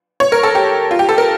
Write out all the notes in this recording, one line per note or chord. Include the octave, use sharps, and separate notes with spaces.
C#5
A#4
A4
G4
F4
G4
A4
A#4